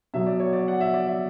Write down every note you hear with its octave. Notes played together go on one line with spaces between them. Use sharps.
B2 F#3 E5
D5
C#5
D5
F#5
E5
D5
E5